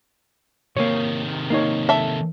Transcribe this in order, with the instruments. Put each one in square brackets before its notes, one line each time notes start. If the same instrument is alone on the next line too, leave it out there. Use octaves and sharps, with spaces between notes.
[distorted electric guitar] C3 D#3 [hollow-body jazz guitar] A#3 C#5
[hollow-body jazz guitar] A#3 D#4 C#5
[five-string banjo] A4 E5